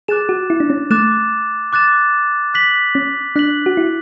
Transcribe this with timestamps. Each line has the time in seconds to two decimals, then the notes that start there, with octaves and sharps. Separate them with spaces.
0.08 G#4 D6 F#6 A6 E7
0.29 F#4
0.50 E4
0.60 D4
0.70 C#4
0.91 A3 D6 F#6 A6 E7
1.73 D6 F#6 A6 E7
2.54 F#6 B6 F#7
2.95 C#4
3.36 D4 F#6 B6 F#7
3.66 F#4
3.77 E4